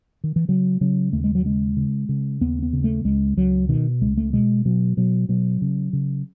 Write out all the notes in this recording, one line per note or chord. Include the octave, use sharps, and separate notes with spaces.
D#3
E3
C#3 F#3
C#3 F#3
D#2 A3
G#3
F#3
C#3 G#3
C#3
C#3
D#2 B3
B3
C#3
A3
C#2 G#3
C#2 F#3
B2 D#3
C#2 G#3
A3
B2 G#3
B2 F#3
B2 F#3
B2 F#3
C#3
C#3